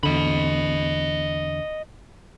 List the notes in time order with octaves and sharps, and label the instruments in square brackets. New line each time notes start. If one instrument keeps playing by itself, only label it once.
[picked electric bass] E2 D3 [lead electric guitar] D#5 B5